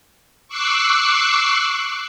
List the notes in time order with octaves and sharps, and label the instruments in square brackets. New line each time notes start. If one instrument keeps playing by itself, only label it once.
[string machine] C#6 D6 E6 F#6 C7